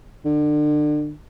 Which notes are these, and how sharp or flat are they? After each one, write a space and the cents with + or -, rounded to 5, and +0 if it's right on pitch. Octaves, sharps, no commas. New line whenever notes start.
D3 +30